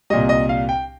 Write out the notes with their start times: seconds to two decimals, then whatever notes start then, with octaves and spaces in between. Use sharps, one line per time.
0.10 C2 A#2 G3 D#5
0.29 D#5
0.49 F5
0.69 G5